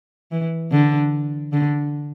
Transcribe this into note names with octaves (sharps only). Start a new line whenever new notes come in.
E3
D3
D3